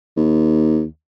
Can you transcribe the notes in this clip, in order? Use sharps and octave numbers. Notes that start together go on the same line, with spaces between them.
D#2